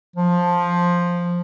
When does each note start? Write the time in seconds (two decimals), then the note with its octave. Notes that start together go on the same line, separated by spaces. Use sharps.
0.16 F3